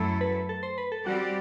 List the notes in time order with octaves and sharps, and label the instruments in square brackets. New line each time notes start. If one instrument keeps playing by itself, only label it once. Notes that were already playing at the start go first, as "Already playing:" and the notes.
Already playing: [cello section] F#2 F#3 A3 E4 A4
[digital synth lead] B4
A4
C5
B4
A4
[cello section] G3 C4 G4 D5 [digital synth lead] F#4